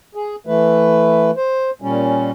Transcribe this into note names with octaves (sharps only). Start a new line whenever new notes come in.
G#4
E3 A3 B4
C5
A#2 G3 C#4